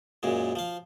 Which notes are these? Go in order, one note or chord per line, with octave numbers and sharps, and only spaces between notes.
F#2 A#2 G#3
F3 F5